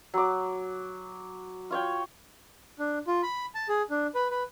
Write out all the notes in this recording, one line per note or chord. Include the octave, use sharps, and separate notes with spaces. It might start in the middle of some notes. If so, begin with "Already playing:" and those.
F#3 D6
F4 C#5 G5
D4
F4
B5
A5
G#4
D4
B4
B4